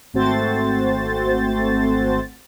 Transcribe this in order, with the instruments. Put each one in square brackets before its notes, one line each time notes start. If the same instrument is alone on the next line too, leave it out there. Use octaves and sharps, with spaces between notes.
[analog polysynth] G#1 A3 C4 F#4 C5 A6